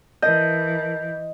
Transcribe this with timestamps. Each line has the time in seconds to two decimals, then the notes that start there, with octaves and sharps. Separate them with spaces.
0.22 E3 A#4 D#5 E5 A5 G6